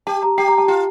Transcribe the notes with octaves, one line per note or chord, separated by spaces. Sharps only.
G4 A5
A#5
G4 G5
A#5
A5
F4 G5